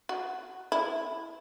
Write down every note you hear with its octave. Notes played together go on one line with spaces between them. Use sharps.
F#4
E4